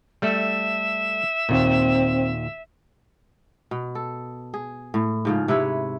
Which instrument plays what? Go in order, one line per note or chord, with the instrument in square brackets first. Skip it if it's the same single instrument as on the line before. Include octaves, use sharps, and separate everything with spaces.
[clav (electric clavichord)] G3 A3 A4 [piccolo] E5
[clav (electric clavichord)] D#2 A#2 [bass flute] C4
[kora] B2
A4
G#4
A2
G#2 C#3 F3
C3 E4 B4 C#5